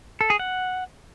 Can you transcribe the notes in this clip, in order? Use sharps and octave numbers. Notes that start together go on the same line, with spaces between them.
A4
G#4
F#5